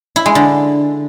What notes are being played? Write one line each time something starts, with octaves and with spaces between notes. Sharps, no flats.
E4
G#3
D3